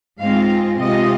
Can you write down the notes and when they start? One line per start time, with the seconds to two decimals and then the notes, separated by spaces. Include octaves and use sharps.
0.20 G#2 G#3 C4 F4 F5
0.80 C3 G#3 F4 D#5